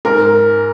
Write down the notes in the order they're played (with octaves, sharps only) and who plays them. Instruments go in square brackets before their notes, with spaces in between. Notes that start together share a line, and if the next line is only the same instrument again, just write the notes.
[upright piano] G#2 A#4